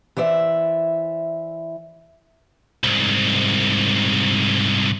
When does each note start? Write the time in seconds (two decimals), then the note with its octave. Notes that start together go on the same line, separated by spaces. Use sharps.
0.17 E3 C5 D5 E5
2.84 C2 G#2